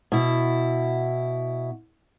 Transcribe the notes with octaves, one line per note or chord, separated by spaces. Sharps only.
B2 E4